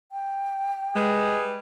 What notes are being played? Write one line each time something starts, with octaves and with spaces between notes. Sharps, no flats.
G5
G3 G#3 G#4 B4